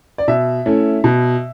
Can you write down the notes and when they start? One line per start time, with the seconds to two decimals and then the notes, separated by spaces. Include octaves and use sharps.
0.18 D5
0.28 B2 E5
0.66 A3 C#4 E4
1.04 B2